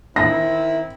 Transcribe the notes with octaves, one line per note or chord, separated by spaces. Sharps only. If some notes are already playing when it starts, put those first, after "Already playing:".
D#3 C4 E4 A#6